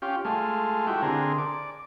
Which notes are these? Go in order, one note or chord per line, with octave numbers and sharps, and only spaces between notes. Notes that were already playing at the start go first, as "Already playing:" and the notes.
C#4 F4 G4
G#3 A3 F4
E4 F#4 G4
D3 C4 G#4 A#4
D5